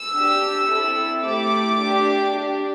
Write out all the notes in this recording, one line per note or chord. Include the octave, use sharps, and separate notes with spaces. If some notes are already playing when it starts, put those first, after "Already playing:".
Already playing: E6
D4 G4
C4 E4 A4
A3 E4 G4 D6
D4 G4
D4 G4